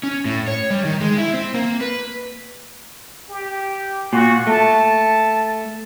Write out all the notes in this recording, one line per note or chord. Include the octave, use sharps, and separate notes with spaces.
C#4
A2
C#5
G3
D#3
G#3
E4
C4
A#3
B4
G4
A#2 F#4
A3 A5